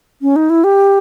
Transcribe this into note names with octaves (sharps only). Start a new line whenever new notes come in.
C#4
D#4
E4
G4